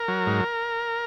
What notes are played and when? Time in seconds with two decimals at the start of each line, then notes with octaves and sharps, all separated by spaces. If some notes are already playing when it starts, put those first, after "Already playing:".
Already playing: A#4
0.08 F#3
0.27 G#2